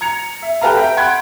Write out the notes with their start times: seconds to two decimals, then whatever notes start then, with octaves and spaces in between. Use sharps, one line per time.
0.01 A#5 G#6 C#7 F7
0.42 E5
0.61 G4 A4 B4 F5 A#5
0.75 E5 G5 A#5
0.97 F#5 G5 B5 C6 G#6